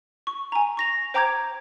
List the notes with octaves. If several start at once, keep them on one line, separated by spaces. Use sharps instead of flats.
C#6
G#5 A#5
C#6 A#6 F7
C5 G5 A#5 D6 G6 G#6